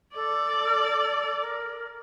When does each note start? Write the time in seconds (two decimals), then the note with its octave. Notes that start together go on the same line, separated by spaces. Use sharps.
0.15 A4 D5
1.41 A#4